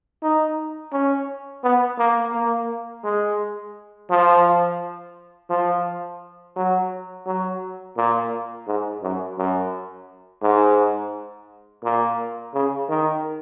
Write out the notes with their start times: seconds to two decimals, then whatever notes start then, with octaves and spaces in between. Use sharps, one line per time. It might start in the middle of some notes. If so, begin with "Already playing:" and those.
0.23 D#4
0.92 C#4
1.64 B3
1.98 A#3
2.34 A#3
3.04 G#3
4.10 F3
5.50 F3
6.56 F#3
7.26 F#3
7.97 A#2
8.67 G#2
9.02 F#2
9.38 F#2
10.43 G#2
11.83 A#2
12.54 C#3
12.89 D#3